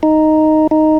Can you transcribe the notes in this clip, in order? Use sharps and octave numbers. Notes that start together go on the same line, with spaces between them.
D#4
D#4